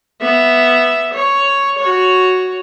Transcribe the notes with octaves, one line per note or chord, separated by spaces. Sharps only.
B3 E5
C#5
F#4 C#5